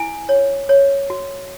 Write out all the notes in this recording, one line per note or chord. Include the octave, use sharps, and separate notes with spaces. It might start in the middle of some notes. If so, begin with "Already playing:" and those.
Already playing: E4 G#5
C#5
C#5
F#4